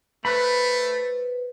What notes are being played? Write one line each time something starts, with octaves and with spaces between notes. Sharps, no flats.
A3 B4 C5 B5 F#6